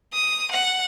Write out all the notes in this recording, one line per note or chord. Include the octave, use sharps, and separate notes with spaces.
D#6
F#5